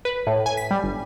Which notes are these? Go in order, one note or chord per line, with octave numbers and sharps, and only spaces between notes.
B4
A2
G#5
B6
G3
G1